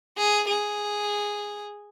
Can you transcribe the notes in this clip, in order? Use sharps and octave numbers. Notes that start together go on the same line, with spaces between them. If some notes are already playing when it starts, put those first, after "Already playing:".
G#4
G#4